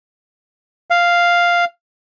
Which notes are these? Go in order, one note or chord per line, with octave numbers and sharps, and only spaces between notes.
F5